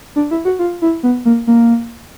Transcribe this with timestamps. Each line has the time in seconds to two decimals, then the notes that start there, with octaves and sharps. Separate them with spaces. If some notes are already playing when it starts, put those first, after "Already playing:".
0.16 D4
0.31 E4
0.45 F#4
0.59 F4
0.82 E4
1.03 B3
1.25 A#3
1.47 A#3